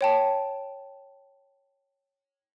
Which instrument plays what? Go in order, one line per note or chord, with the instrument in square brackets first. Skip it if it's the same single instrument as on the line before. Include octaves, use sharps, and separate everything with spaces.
[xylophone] C#5 G5 A5